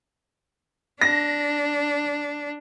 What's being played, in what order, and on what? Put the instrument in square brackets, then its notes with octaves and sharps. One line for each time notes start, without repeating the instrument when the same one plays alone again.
[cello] D4 [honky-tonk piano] A#6